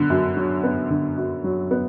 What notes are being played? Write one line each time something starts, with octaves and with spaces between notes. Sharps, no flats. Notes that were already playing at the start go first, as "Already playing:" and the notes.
Already playing: D3 F#3 B3
F#2
F#3
B3
D3
F#2
F#3
B3